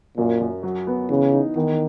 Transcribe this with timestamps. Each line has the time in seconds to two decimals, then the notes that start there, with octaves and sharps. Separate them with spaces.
0.17 F#2 A#2
0.41 F#2
0.63 F#3
0.87 B3
1.09 C#3 E3
1.33 D#4
1.55 E2 D#3